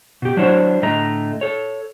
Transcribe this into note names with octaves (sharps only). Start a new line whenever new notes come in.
B2 G4
F#3 D4 E4 F#4 C5 C#5
A2 D3 A3 D#5 A#5
A4 C#5